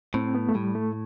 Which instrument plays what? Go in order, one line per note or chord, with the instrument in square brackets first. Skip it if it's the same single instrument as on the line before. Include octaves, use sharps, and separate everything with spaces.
[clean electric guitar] A2 [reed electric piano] C4
[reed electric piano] B3
A3
[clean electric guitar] A2 [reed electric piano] G3
[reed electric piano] A3